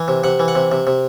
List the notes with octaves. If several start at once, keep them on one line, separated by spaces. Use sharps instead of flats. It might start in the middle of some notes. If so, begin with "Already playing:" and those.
Already playing: E3
C3
C3 F#5
E3
F#5
C3
C3
C3